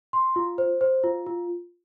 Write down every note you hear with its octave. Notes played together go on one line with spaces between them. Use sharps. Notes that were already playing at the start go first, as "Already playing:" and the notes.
C6
F4
C5
C5
F4
F4